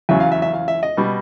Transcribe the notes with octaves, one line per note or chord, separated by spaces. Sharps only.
E2 C#3 F#3 E5
F5
E5
E5
F5
E5
D#5
B2 G3